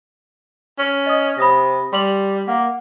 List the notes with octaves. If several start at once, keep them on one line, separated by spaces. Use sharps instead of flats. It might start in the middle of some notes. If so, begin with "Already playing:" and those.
C#4
D#5 D#6
C3 B5 D#6 A#6
G3 C6 F7 F#7
A#3 F#5